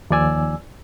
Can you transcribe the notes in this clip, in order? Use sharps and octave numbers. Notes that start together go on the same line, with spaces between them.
D#2 F3 D5 G#5 E6